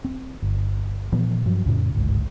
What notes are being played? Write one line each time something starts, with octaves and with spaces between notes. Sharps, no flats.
C4
G1
A#2 E3 F3 B3
G2 F3 F#3
F2 A2 C#3
G1 C#2 G#2